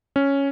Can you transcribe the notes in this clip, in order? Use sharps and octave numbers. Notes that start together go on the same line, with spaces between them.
C#4